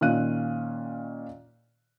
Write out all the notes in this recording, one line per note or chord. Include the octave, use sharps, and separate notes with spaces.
A#2 D#3 C#4 F5 F#6 D#7